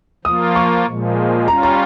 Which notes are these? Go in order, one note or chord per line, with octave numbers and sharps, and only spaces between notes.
F3 A#3 F4 D#6
C#6
A#2 F3 G#3
G3 C#4 F4 A#5
A#5